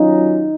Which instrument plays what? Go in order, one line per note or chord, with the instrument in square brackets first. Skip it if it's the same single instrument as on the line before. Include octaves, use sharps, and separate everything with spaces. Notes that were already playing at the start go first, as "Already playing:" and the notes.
Already playing: [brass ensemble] F#3 C#4 F4 [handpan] D#4